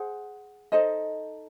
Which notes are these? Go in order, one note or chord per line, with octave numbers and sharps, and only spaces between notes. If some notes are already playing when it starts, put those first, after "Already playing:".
Already playing: G#4 C5 F#5
D#4 A4 C5 D#5